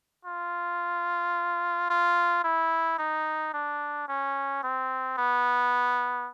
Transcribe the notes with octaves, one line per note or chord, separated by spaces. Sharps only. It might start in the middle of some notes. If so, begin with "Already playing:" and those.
F4
F4
E4
D#4
D4
C#4
C4
B3